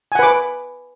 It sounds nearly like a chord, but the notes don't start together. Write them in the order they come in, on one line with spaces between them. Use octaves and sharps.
G#5 F#5 B4 D6